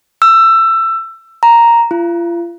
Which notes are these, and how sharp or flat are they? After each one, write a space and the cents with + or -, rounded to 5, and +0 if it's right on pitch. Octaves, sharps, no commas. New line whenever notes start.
E6 +20
A#5 +0
F4 -40